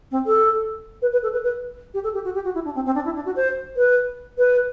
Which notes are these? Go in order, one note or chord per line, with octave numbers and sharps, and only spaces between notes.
C4
A4
B4
B4
A4
B4
B4
G4
A4
G4
F#4
G4
F#4
E4
D4
C4
C4
D4
E4
D4
F#4
C5
B4
B4